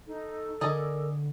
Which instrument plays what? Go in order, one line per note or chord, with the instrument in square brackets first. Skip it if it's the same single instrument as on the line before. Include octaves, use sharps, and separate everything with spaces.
[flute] D#4 [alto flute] A4
[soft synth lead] D3 [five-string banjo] G#4 D5 D#5 [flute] A#4